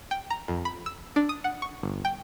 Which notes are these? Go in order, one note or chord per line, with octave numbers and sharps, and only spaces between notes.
G5
A#5
F2
B5
E6
D4
D#6
F#5
C#6
G1
G5